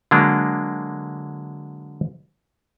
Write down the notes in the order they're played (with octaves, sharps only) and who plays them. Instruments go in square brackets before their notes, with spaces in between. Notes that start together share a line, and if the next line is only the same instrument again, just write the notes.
[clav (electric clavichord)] D3 F#3 G#3 A#3 D4